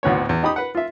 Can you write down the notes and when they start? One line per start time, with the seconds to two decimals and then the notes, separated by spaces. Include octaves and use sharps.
0.03 G#1 D2 A2 B3 C#5
0.29 E2
0.43 D#4 G4 B5 D#6
0.56 B4 F#5
0.75 F4 E5